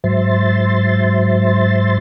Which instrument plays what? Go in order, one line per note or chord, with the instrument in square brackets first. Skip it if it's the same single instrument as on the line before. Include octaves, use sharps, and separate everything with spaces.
[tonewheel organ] G#2 F#3 C5 E5 C6 A6